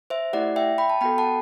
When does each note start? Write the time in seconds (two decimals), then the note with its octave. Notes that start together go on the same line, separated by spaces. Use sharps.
0.10 C5 E5
0.33 A3 E4 G4 D5 F#5
0.56 E5 G5
0.78 G5 B5
0.90 A5
1.01 B3 F#4 A4 G5 B5
1.18 F#5 A5